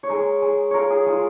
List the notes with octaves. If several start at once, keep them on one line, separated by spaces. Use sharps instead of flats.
C#5
G#3 A#4
G#3
F4 A#4 C#5
G#4
G#3 F4